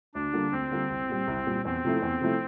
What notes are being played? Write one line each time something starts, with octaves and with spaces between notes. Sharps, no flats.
D2 D4
D3 G3 A#3 F4
D2 C4
D3 G3 A#3 F4
C2
A#2 G3
C2
A#2 G3
E2 C4
C3 F3 A3 E4
E2
C3 F3 A3 E4